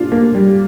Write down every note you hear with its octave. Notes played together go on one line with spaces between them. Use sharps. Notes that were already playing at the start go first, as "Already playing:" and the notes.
Already playing: D4 F4
A#3
G3